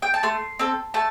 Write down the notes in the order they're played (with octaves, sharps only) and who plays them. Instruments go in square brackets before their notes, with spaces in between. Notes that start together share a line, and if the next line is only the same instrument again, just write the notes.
[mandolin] G5
A5
A3 C6
C4 A4
A3 A5